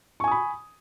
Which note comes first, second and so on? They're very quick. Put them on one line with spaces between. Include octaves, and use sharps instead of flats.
C#6 G#5 D#6 B5